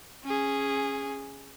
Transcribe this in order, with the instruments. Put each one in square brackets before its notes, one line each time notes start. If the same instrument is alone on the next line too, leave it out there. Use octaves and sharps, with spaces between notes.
[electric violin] C#4 G#4